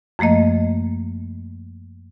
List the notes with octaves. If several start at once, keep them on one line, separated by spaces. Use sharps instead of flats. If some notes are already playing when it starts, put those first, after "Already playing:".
F#2 F3 A3 A#3 D#5